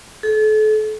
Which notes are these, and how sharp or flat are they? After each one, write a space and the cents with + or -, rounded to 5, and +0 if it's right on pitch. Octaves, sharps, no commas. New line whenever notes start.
A4 -35